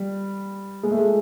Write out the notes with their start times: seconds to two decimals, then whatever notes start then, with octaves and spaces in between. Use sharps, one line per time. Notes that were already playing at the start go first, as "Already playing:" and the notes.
Already playing: G3
0.83 G#3
0.91 A3
0.98 G#3